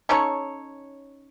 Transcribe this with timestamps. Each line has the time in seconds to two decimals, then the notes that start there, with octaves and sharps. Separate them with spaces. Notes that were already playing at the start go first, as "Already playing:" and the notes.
0.09 C#4 D#4 A4 C#5